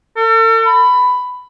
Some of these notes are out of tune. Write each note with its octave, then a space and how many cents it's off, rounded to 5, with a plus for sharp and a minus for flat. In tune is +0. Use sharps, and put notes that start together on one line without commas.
A4 +40
B5 +15